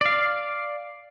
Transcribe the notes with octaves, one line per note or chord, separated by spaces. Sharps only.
D5 F5